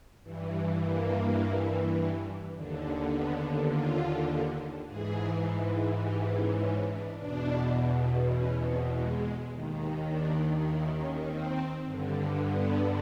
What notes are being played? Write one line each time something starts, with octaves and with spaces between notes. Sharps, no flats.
G2 E3
A#3
D#2 D3
B3
F4
G#2 E3 G#4
G4
C#4
C#4
D4
E2 B2 D4
C#4
C4
G#3
D#2 D#3
D4
E4
C#4
C4
G2 D3
B3